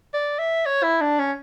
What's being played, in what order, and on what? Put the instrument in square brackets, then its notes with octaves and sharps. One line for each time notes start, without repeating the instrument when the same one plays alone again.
[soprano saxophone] D5
E5
C#5
E4
D4
C#4